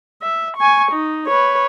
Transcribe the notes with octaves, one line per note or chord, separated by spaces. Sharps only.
E5
G#5 C#6
D#4
B4 C#5